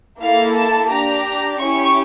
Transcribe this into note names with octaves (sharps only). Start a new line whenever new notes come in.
A#3 E4 A4 F5
A5
D4 G4 A#5
C#4 E4 G4 C#6